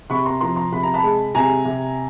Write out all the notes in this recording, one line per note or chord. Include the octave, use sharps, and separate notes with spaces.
C3 B5 C#6
A#5 C6
F3 A#5 C6
A#5 C6
C3 B5
A#5
A5 B5
G#3
C3 G#5 A#5
C3